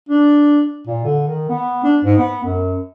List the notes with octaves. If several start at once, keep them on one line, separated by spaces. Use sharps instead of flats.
D4
A#2
D3
D#3
B3
D4
G#2
B3
F#2